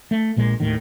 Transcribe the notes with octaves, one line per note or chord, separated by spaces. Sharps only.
A3
A#1 A#2 G#3
D#2 A2 D#3